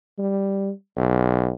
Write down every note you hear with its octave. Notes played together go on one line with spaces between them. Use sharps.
G3
B1